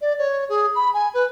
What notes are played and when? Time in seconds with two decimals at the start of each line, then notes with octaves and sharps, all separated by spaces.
0.01 D5
0.18 C#5
0.49 G#4
0.75 B5
0.94 G#5
1.14 B4